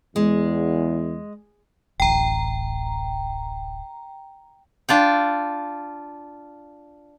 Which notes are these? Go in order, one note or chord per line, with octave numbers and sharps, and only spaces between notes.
E2 G#3
D1 A1 G5 A#5
D4 F4 G5